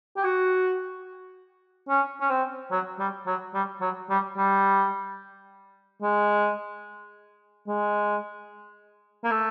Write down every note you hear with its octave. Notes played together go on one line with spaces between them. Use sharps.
G4
F#4
C#4
C#4
C4
F#3
G3
F#3
G3
F#3
G3
G3
G#3
G#3
A#3
A3